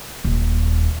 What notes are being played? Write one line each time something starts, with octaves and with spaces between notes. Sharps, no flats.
D#1